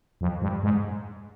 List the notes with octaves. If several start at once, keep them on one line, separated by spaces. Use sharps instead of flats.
F2
G2
G#2